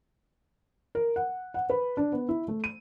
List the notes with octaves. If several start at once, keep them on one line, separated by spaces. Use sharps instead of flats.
A#4
F#5
F#5
B4
D4
B3
E4
A3
D#7